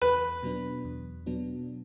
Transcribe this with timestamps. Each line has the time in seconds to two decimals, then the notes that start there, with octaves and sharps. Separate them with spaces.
0.02 E2 B4
0.43 B2 F#3 B3 D4
0.85 E2
1.26 B2 F#3 B3 D4